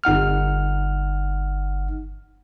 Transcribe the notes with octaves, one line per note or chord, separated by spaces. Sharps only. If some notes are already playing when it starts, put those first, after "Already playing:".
G1 D#4 F#5 F6